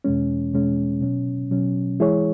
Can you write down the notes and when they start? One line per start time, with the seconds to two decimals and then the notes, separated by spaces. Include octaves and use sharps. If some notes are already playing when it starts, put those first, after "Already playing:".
0.04 E2 B2 G#3 C#4
0.53 E2 B2 G#3 C#4
1.01 B2 F#3 C#4
1.51 B2 F#3 C#4
2.00 E3 G#3 E4 G#4 C#5